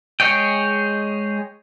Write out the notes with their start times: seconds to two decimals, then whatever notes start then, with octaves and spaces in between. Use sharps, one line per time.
0.20 G#3 G#4 C#5 D#5 G5